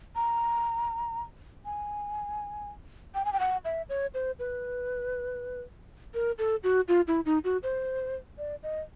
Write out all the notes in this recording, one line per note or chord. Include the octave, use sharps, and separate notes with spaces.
A#5
G#5
G5
G#5
G5
F#5
E5
C#5
C5
B4
A#4
A4
F#4
F4
E4
D#4
F#4
C5
D5
D#5